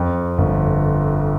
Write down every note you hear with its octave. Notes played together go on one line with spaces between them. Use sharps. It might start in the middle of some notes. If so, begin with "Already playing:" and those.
Already playing: F2
G1